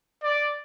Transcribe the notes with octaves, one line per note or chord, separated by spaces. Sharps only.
D5